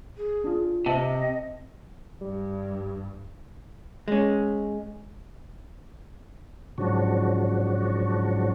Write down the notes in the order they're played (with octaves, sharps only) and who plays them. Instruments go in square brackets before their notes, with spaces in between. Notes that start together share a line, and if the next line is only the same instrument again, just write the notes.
[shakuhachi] G#4
[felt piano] D4 F4
[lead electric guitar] C3 [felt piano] C4 E5 A5 [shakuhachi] D#5
[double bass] G2 [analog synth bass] G3
[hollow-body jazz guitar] G#3 C#4
[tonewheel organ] G#2 C#3 F3 F#3 D4 F#4